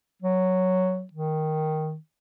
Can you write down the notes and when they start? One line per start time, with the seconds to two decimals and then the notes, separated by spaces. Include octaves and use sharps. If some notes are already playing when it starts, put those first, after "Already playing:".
0.22 F#3
1.13 D#3